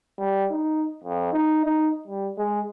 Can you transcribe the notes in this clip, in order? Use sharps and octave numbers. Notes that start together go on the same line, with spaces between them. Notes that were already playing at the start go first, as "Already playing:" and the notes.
G3
D#4
F2
D#4
D#4
G3
G#3